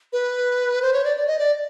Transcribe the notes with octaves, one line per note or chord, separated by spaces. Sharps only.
B4
C5
C#5
D5
D5
D#5
D5